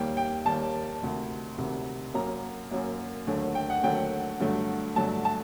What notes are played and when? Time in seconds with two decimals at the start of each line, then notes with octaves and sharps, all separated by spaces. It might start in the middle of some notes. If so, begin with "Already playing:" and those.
Already playing: D#2 D#3 G3 A#3 G5
0.17 G5
0.45 D#2 D#3 G3 A#3 A5
1.02 D2 C3 D#3
1.58 D2 C3 D#3
2.14 F#2 F#3 A#3 A#5
2.71 F#2 F#3 A#3
3.27 D#2 D3 F#3 A3
3.55 G5
3.70 F#5
3.83 D#2 D3 F#3 A3 G5
4.40 G2 D3 F#3 A3
4.96 G2 D3 F#3 A3 A5
5.25 A5